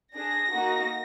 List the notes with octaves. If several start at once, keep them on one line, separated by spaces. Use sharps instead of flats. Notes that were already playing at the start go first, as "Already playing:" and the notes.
D4 G#4 A#6
A#3 D#4 F#4